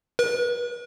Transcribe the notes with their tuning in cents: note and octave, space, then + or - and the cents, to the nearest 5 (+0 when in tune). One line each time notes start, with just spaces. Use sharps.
B4 -40